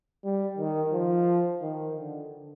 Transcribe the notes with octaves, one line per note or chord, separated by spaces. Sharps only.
G3
D#3
F3
D#3
D3